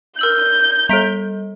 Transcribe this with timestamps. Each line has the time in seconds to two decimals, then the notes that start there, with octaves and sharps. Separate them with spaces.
0.19 A#4 E6 G6 F#7
0.89 G3 A4 A#5 B6 D7